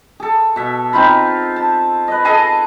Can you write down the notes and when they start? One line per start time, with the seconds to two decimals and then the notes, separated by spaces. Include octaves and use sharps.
0.20 G#4 A4
0.56 B2 E5
0.93 C4 D#4 F4 B5
1.56 A5
2.08 B4 D#5
2.25 G#4 A4 D#5 A5